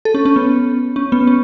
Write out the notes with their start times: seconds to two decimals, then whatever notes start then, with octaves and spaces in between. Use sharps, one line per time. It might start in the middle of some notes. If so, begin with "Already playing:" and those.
0.05 A4
0.14 C#4
0.25 C#4
0.36 B3
0.96 C#4
1.12 B3
1.27 C#4